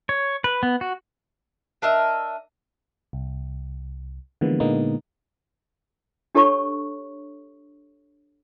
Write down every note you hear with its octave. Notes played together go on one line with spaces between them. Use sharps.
C#5
B4
B3
F#4
D4 A#4 D#5 E5
C2
D3 E3 F3 G#3 A#3 B3
A#2 D3 G#3 A#3 B3 D#4
D4 G4 A4 C#5 A5 C#6